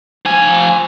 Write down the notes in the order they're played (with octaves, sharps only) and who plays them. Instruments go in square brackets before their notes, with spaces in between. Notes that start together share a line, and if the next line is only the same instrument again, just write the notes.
[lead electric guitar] F3 G#5